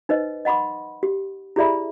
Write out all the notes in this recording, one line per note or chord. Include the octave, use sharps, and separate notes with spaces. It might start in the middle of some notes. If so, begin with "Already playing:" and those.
D#4 B4 C5 D#5
D#5 F#5 B5 C6 D6
G4
E4 G4 G#4 D5 E5 B5